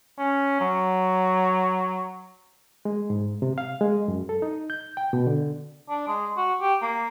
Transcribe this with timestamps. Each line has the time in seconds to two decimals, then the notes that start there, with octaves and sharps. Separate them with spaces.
0.19 C#4
0.60 F#3
2.85 G#3
3.10 G#2
3.42 C3
3.58 F5
3.81 G#3
4.08 F#2
4.29 A4
4.42 D#4
4.70 G6
4.97 G5
5.13 B2
5.27 D3
5.89 D4
6.08 G#3
6.37 F#4
6.61 G4
6.82 A#3